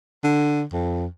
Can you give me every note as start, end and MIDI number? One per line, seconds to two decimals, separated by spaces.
0.24 0.63 50
0.72 1.06 41